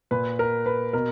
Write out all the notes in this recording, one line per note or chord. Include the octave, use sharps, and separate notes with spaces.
A#2 B4
A#4
B4
B2 A#4